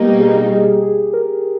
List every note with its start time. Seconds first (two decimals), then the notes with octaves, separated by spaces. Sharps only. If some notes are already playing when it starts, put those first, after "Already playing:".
Already playing: B2 G3 A#3 D#4 G4
0.20 G#4
0.42 G4
0.52 G#4
0.82 G#4
1.13 A#4